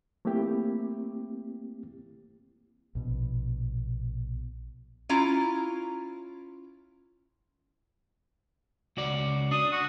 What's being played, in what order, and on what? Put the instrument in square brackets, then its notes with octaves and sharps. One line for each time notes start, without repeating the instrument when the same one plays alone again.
[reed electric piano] A3 A#3 C4 E4 G4
[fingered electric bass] A#1 B2
[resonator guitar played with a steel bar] C#4 E4 F4 A#5
[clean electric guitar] C#2 F#4 D5
[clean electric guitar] D4 [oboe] D#6
[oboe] F#4